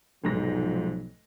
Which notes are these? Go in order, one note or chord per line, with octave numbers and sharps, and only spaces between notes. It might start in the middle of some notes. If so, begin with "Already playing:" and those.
F1 B1 G#2 F3 A#6